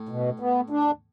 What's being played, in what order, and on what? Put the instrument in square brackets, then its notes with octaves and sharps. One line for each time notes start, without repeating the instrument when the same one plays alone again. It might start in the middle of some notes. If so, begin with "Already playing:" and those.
Already playing: [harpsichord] A2
[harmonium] B2
B3
D4